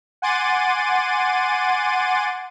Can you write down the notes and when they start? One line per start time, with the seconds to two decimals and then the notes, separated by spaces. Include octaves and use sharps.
0.22 F#5 G#5 C6 D6 A6 D#7